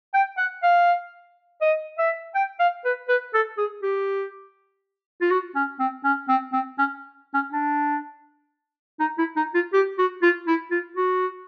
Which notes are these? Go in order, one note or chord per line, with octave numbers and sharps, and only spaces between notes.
G5
F#5
F5
D#5
E5
G5
F5
B4
B4
A4
G#4
G4
F4
F#4
C#4
C4
C#4
C4
C4
C#4
C#4
D4
D#4
E4
D#4
F4
G4
F#4
F4
E4
F4
F#4